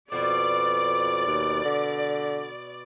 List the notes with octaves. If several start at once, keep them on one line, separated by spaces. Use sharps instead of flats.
F2 B2 D5 D6
D#2
D3